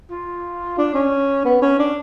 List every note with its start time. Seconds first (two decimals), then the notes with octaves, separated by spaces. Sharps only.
0.11 F4
0.78 D4
0.94 C#4
1.45 B3
1.62 C#4
1.79 D4